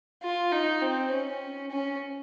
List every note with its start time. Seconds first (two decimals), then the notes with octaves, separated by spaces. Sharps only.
0.23 F4
0.52 D#4
0.82 C4
1.12 C#4
1.71 C#4